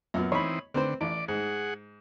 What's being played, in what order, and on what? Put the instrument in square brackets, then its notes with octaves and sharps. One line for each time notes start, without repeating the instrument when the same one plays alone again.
[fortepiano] F#2 A#2 B3
[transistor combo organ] E3 C4 D#4 [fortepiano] C#5 B5
[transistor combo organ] D3 [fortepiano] C4 B4 C5
[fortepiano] A1 [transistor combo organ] D5
[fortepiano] G#2 [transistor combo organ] G#4 F#5